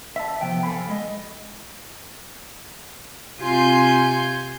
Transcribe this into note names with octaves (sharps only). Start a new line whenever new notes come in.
E5 A5
C3 F3 B3 G5
A4 B4 F5 G#5 B5
G#3 D#5
C3 F4 G#5 C6 G6